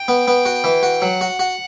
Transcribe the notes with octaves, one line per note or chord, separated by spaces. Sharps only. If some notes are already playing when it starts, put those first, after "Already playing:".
Already playing: G5
B3
B3
F#4
E3
F#4
F#3 F#5
F#4
F#4